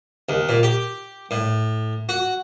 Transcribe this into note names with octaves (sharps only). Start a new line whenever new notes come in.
D#2
A#2
G4
A2
F#4